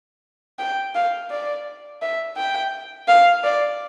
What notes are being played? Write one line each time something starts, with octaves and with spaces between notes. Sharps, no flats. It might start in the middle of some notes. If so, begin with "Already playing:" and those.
G5
F5
D5
E5
G5
F5
D5